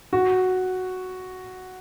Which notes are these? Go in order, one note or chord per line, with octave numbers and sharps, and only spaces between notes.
F#4